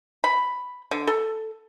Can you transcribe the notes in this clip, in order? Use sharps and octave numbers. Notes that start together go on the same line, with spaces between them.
B5
D3
A4